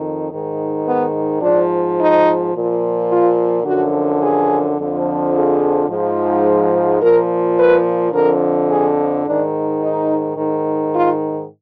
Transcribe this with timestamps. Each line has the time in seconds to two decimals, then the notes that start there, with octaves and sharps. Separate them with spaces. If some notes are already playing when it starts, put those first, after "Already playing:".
Already playing: F2 D#3
0.30 G#2 D#3
0.86 B3
1.41 G#2 F3 D4
1.97 D#4
2.53 A#2 F3
3.08 F4
3.64 F#2 D3 F3 F#4
4.21 G#4
4.77 F2 D3 F3
5.33 G#4
5.88 G#2 F3
7.00 A#2 F3 A#4
7.56 B4
8.11 F2 D3 F3 A#4
8.68 G#4
9.24 G#2 D#3 D4
9.80 D#4
10.36 G#2 D#3
10.91 F4